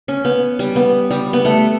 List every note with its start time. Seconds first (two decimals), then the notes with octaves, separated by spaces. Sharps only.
0.08 C#4
0.25 B3
0.59 G3
0.76 B3
1.11 G3
1.33 B3
1.45 A3